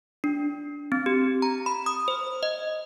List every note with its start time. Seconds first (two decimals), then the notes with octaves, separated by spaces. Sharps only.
0.24 D4
0.92 C4
1.06 G4
1.42 A#5
1.66 B5
1.86 D#6
2.08 C5
2.43 D#5